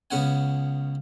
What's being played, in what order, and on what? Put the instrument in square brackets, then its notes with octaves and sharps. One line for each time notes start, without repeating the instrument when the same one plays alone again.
[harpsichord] C#2 C#3 B3 F#5 G#5